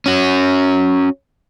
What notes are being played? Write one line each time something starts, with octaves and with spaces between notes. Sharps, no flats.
C#4 F#4